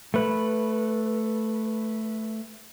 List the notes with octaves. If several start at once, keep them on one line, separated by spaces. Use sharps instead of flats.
A3 B4